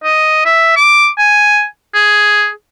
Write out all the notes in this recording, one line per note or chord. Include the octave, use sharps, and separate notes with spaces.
D#5
E5
D6
G#5
G#4